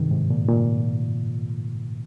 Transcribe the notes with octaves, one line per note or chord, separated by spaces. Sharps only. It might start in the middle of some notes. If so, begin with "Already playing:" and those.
Already playing: G2 C3 D#3
G#2
A#2
A#2